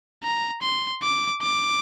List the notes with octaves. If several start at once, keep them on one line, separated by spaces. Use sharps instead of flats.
A#5
C6
D6
D6